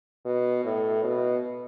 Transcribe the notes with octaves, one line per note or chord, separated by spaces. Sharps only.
B2
A2
B2